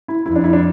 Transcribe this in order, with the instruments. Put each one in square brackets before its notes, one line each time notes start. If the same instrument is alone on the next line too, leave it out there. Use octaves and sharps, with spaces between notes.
[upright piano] E4
[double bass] F2 [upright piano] E4
[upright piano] D4
E4
D4